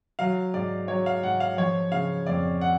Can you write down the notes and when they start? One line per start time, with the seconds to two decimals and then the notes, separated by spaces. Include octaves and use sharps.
0.19 F#3 F5
0.54 G#2 D5
0.88 F#3 C#5
1.06 F5
1.23 G#2 F#5
1.40 F5
1.57 F3 C#5
1.92 C#3 F5
2.26 F2 D5
2.61 F#5